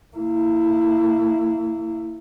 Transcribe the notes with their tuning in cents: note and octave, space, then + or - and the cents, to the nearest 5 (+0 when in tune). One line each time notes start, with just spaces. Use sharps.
A#3 -30 E4 +0